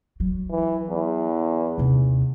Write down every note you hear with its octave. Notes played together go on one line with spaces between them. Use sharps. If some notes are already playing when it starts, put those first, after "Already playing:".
F#3
E3
E2
D#2 C3